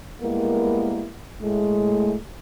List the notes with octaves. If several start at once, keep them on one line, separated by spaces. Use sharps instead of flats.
G3 G#3 A#3 B3 E4 A#4
A2 G#3 A3